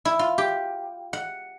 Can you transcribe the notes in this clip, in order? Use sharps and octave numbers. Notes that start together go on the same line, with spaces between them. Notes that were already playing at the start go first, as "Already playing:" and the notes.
E4
F4
G4
F#5